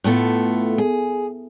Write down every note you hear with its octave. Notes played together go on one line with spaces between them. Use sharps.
A2 A3 B3 F4
G#4